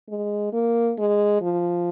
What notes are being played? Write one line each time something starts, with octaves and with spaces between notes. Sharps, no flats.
G#3
A#3
G#3
F3